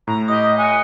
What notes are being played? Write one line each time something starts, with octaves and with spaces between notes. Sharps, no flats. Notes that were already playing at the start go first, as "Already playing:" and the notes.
A2 A#5
G4 D#5 D#6
F#5 G#5